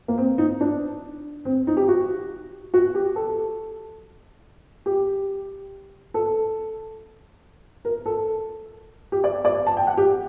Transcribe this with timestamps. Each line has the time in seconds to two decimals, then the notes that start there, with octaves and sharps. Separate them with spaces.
0.08 A#3
0.18 C4
0.38 D#4
0.61 D4
1.45 C4
1.67 D#4
1.77 G4
1.88 F#4
2.74 F#4
2.95 G4
3.16 A4
4.86 G4
6.14 A4
7.85 A#4
8.06 A4
9.12 G4
9.24 D5
9.45 D5
9.67 A5
9.77 G5
9.87 F#5
9.97 G4